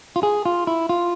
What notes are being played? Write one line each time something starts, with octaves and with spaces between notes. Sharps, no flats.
F4
G#4
F4
E4
F4